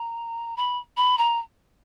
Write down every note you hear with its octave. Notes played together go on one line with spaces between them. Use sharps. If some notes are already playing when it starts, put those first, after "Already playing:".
Already playing: A#5
B5
B5
A#5